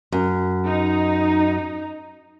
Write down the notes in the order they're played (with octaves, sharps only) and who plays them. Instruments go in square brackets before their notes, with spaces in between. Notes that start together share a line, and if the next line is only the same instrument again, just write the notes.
[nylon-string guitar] F#2
[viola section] D#4